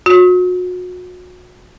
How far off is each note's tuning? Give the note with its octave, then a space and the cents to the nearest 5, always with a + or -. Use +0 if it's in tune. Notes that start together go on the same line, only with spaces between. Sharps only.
F#4 -35